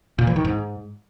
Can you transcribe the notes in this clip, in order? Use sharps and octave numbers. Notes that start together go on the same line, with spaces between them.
A#2
E3
D#3
G#2